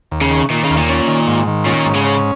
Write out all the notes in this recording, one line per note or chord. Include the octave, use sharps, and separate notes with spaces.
D#2
C#3
D#3
A#2 D#3
C#3
D#2
A#2
C#4
D#3
G#2
D#3
A#2 C#4
G#2
C#3
C#4